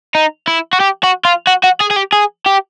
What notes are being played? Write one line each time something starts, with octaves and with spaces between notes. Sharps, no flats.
D#4
E4
F#4
G4
F#4
F4
F#4
F#4
G#4
G#4
G4
G#4
G4